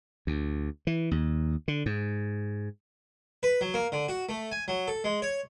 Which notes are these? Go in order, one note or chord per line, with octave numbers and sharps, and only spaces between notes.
D2
E3
D#2
D3
G#2
B4
F#3
A#3
D3
F#4
A3
G#5
F#3
A4
G#3
C#5